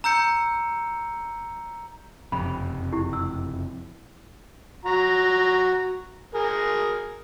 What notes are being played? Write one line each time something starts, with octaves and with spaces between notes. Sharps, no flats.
A#5 E6 G6 C#7
F#1 F2 C3 B5
E4 G4
E6
F#4 A#5
G#4 A#4